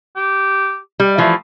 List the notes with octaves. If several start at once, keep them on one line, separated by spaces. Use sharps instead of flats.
G4
G3
E3 F3 A3